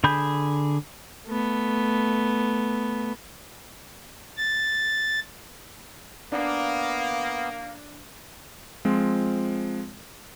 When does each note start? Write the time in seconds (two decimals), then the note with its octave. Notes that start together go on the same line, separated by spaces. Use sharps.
0.04 D3 G#4 B5 G6
1.27 A3 B3
4.37 A6
6.32 A#3 B3 D4 F5
8.85 F3 G#3 C4 F4